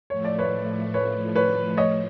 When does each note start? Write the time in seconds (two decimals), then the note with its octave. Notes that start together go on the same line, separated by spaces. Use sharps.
0.10 A2 F3 A3 C#5
0.24 D5
0.38 B4 C#5
0.94 B4 C#5
1.35 B4 C#5
1.77 C#5 D#5